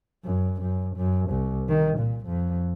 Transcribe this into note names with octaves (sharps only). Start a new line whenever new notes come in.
F#2
F#2
F#2
C2
D#3
A#2
F2